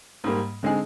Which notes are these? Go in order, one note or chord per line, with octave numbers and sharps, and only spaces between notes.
G#2 G3 A#3
D3 G#3 C4 D#4 G#4